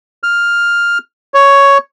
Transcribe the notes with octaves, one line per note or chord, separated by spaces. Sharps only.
F6
C#5